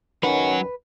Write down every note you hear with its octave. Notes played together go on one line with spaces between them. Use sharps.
C#2 F#2 D#3 F#3 C#4 B4 F#5